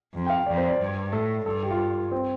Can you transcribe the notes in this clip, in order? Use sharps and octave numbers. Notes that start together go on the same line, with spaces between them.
F2
G5
F5
F2 D5
C5
D5
G2
A2 A4
G2 A4
G4
F4
C4